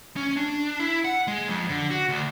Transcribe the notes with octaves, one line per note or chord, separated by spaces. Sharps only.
C#4
D4
E4
F#5
G#3
F2
D3
F#4
D2